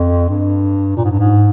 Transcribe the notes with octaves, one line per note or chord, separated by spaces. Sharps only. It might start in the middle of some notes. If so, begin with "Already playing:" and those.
Already playing: F2
G2
A#2
G#2
G2
G#2